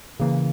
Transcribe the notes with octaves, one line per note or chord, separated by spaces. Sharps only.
C#3 E3 A#3